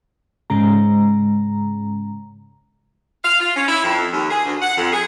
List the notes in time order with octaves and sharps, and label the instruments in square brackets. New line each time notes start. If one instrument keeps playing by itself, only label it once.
[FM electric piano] G#2 C#3 G#3 A#5
[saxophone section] F5
F4
C#4
E4
F2
D#2
G#4
D2
F#5
F2
G#4